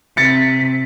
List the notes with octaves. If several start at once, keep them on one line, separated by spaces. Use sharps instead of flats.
C3 A6 B6 C#7